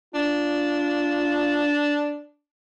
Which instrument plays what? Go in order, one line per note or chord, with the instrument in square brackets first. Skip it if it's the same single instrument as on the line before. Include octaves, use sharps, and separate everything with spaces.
[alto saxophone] D4 [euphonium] F4